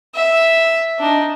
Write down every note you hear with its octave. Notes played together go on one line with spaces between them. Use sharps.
E5
D4 D#4